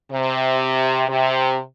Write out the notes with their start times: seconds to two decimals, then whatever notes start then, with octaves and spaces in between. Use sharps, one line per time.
0.11 C3
1.08 C3